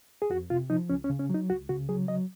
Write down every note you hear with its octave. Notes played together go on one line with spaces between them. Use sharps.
G#4
F2 F#4
C3 F4
F3 D#4
C#2 C#4
C#4
C#3
C#4
F#3 D#4
C#2 F#4
C#3 F#4
F#3 G#4
F#3 D#5